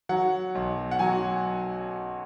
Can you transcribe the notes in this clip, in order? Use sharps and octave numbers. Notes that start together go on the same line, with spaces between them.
F#3 F#5
B1
F#5
F#3 G#5